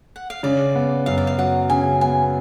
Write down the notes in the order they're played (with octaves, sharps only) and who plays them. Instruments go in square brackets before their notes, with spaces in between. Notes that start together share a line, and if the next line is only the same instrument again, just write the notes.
[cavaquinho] F#5
F5
[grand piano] C#3 [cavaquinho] D5
[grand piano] B3
[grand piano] F#2 [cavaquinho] F5
[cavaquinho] D5
F5
[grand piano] F#3 [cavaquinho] F#5
[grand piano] C#3 [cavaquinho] G#5
[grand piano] B3 [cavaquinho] G#5